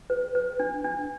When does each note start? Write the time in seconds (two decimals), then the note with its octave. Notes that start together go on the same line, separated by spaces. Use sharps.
0.10 B4
0.35 B4
0.60 D4
0.84 D4